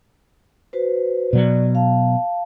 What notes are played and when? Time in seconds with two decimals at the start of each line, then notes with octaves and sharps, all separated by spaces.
0.73 F#4 B4 C5
1.33 B2 F#3 D5
1.75 F5 A5